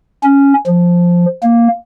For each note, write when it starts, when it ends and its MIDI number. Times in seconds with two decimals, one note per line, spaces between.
0.24 0.54 61
0.66 1.25 53
1.43 1.68 58